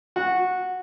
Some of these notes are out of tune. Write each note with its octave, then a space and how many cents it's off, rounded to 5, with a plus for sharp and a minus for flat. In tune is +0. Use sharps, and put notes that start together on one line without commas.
F#4 -10